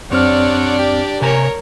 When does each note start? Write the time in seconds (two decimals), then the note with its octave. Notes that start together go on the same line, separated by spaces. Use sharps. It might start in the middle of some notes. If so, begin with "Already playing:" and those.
0.11 F#2 C3 C4 D4 C#5 D5 F#5 F6
0.78 G4
1.22 C3 A#4 C#5 G#5 A#5